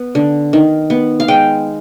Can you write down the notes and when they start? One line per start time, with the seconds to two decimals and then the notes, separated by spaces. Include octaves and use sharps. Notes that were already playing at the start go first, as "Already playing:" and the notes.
Already playing: B3
0.15 D3
0.53 D#3
0.90 B3
1.20 F5
1.28 G#3 G5